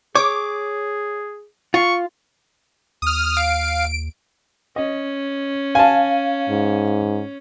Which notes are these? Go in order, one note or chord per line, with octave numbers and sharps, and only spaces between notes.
G#4 C#5 D6
F4 C#6
D#2 D#6 F6
F5 D7
C#4 D#5
F5 G#5 A5
G#2